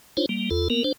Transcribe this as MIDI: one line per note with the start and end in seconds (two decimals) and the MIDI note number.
0.17 0.26 62
0.17 0.26 63
0.17 0.26 65
0.17 0.26 72
0.17 0.26 73
0.29 0.49 55
0.29 0.49 58
0.51 0.68 40
0.51 0.68 65
0.51 0.68 69
0.70 0.83 58
0.70 0.83 59
0.70 0.83 70
0.84 0.92 62
0.84 0.92 72